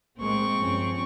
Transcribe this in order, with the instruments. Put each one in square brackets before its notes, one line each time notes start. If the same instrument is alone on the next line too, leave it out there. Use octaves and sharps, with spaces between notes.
[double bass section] A2 G#3 A#3 [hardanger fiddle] C4 C#6
[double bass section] G2 F3 C#4